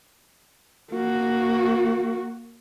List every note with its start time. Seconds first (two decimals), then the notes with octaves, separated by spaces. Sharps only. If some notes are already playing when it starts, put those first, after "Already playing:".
0.91 A#3 F#4